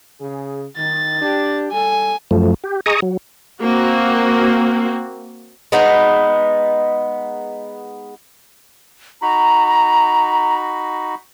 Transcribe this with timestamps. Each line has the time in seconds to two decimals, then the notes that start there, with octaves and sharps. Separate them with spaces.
0.21 C#3 G#4
0.77 D#3 A6
1.21 D4 G4
1.72 G3 A4 G#5
2.31 F#2 F3 A3
2.64 G4
2.86 G#4 D#5 A#5 C#6 D#6
3.02 F#3
3.61 A#3 C4 F#4
5.72 G#3 B3 D#4
9.22 D#4 F#4 A#5 B5